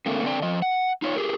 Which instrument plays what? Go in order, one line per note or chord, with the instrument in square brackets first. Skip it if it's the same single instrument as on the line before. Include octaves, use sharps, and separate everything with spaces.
[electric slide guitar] D3 A3 A#3 C4
D3 C4 D4 F#5 G5
F3 D#5
F#5
D#4 F4 C#5
G4 G#4 A#4